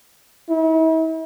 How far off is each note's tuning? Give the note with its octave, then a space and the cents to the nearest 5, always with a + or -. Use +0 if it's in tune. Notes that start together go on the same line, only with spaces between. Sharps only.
E4 -45